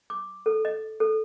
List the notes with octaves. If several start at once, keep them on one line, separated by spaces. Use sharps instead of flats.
D6
A4
D#5
A4